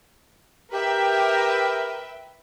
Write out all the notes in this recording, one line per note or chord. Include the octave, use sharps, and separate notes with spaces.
G4 A#4 B4 E5 G5